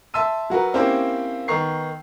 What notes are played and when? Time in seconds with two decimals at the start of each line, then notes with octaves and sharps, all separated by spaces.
0.14 E5 A5 C6 E6 D#7
0.50 F#3 F#4 A#4 B4
0.74 A#3 C4 C#4 E4 G4 C5
1.48 D#3 B3 A#5 C#6 C7